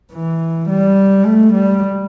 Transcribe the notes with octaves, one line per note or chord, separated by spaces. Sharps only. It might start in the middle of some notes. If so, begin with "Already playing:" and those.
E3
G3
A3
G3